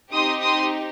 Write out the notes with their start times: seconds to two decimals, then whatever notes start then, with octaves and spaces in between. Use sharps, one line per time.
0.13 C4 D#4 G4 C6 D#6
0.41 C6 D#6